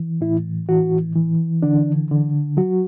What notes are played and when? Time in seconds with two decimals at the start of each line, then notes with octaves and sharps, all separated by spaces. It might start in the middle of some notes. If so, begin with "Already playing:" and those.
Already playing: E3
0.21 A2 E4
0.69 E3 F#4
1.15 E3
1.62 D3 D4
2.11 D3
2.57 F#3 F#4